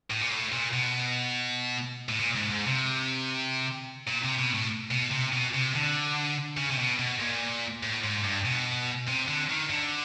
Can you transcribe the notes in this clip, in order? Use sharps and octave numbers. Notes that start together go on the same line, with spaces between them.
A2
A#2
A2
A#2
B2
A2
A#2
G#2
G#2
C3
A#2
C3
B2
A2
B2
C3
B2
C3
D3
C#3
C3
B2
B2
A#2
A2
G#2
G2
B2
C3
D3
D#3
D3